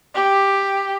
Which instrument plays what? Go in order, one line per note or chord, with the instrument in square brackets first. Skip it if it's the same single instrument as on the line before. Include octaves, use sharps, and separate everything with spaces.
[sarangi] G4